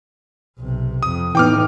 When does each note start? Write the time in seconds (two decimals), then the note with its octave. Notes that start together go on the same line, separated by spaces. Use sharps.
0.59 B1 C3
1.03 F2 D#6
1.35 A2 E3 B3 D#4 G5 D6 F6